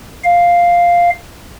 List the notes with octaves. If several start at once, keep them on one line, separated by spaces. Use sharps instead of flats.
F5